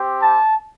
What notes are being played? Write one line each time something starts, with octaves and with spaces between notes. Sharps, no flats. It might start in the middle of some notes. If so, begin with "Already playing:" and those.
Already playing: C4 G4
A5